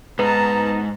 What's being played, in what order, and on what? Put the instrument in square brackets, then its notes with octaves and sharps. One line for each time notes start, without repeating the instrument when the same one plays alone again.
[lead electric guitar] G#2 [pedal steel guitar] B3 D#4 [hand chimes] B4 [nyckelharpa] A5 A#5